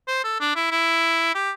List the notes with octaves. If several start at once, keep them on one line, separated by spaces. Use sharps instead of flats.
C5
A4
D4
E4
E4
G4